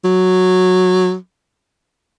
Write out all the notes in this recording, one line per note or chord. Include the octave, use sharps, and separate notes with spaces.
F#3